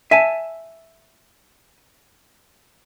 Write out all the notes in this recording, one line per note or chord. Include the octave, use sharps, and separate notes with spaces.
E5 G#5 A5